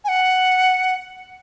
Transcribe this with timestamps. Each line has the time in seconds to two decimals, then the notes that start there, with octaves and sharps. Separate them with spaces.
0.04 G#5
0.08 F#5